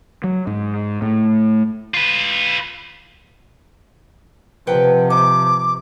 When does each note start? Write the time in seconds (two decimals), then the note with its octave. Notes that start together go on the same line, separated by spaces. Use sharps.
0.24 F#3
0.47 G#2
1.02 A2
1.94 F4 B4
4.67 C3 F3 B4 F#5 G5
5.10 D#4 D6